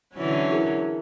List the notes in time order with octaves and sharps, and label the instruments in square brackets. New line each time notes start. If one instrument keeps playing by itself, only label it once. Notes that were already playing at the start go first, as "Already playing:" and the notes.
[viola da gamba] D3 E3 C#4 [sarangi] F#3
[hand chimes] E4 G#4 A#4